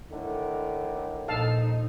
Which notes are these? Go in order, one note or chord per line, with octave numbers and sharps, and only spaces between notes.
A2 D3 D#3
A#1 D#4 A4 F5 A5